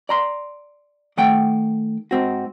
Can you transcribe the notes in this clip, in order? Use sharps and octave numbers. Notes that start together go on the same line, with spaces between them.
D5 A#5 C6
D#3 A3 F#5 G5
G#2 C4 F#4